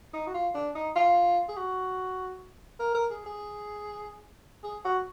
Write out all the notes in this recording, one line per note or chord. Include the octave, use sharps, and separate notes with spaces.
D#4
F#4
F4
D4
D#4
F4
G#4
F#4
A#4
A#4
G#4
G#4
G#4
F#4